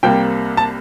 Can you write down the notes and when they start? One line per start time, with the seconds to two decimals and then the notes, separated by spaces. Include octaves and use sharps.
0.03 C2 C3 G3 A#3 G5
0.57 A5